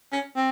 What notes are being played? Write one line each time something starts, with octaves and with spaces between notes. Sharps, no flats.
C#4
C4